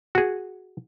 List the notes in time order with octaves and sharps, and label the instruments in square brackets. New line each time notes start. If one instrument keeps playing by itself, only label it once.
[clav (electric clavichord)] F#4 G#4